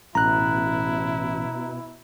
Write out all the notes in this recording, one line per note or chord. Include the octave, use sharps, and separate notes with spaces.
A1 B2 E4 A#5 F#6